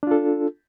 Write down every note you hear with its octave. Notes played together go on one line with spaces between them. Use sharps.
D4 F4 A4